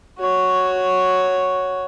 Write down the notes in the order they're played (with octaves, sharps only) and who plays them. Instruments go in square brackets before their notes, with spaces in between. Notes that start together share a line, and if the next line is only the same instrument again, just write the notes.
[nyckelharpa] F#4 C#5